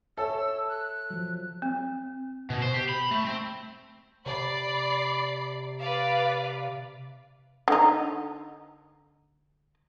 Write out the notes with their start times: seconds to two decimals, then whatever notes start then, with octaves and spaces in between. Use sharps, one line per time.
0.18 A4 C#5 E5 E6
0.69 F#6
1.10 F3 F#3
1.62 C4
2.50 B2
2.62 C5
2.74 G4
2.89 B5
3.11 A3
3.25 C4
4.26 C3 D5 B5 C7
5.79 B4 D5 F5
7.68 D3 D#4